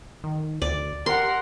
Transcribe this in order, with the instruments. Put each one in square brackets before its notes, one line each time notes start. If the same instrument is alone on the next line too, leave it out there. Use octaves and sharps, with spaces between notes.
[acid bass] D#3
[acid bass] D2 [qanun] D5
[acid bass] G4 [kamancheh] A#4 F#5 [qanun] C6